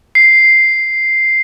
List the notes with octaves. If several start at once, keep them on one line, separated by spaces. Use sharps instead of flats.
C7